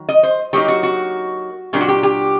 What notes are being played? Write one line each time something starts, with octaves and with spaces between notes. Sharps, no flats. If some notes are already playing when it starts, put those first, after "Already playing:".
Already playing: D#3 F#3
D#5
C5
F#3 A#3 D#4 G4
F#4
F#4
A#2 F#3 A#3 D4 G4
F#4
G4
G4